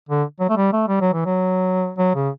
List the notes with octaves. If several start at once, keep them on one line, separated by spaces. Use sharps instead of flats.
D3
F#3
A3
G3
A3
G3
F#3
E3
F#3
F#3
C#3